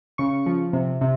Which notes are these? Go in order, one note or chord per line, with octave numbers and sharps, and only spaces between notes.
C#3 C#6
F3
C3
C3